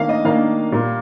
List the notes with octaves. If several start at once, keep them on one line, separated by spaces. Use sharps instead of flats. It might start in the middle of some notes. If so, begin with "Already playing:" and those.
Already playing: D#3 A#3 D4 F5
D#5
D#3 A#3 D4 F5
A#2 G3 A#3